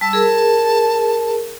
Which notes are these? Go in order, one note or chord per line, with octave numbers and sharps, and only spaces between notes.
G3 A5 E6
G#4 A#4